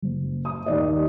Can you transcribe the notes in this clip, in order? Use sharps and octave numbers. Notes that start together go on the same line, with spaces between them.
F#1
D#6
D#2 D#3 D5 D#5